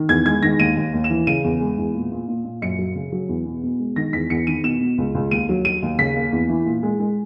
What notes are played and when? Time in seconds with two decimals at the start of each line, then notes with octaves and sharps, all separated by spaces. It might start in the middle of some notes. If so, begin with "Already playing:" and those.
Already playing: D#3
0.09 E2 G#6
0.26 G#3 G#6
0.42 D#3 A#6
0.59 D#2 D#7
0.77 D#2
0.94 D#2
1.04 E7
1.10 E3
1.27 C#3 D#7
1.44 E2
1.61 G#3
1.78 E2
1.94 A#2
2.11 A#2
2.28 A#2
2.45 A#2
2.62 F#2 C#7
2.78 F#3
2.95 C#3
3.12 F#3
3.29 E2
3.46 B2
3.63 B2
3.79 G#3
3.96 D#3 A#6
4.13 E2 B6
4.30 E2 C#7
4.47 D#3 D#7
4.64 B2 E7
4.81 B2
4.98 C#2
5.15 C#2
5.31 D#2 D#7
5.49 F#3
5.65 F#3 D#7
5.82 D#2
5.98 C#3 B6
6.16 A#3
6.32 E2
6.49 E3
6.66 A#2
6.83 G#3
7.00 G#3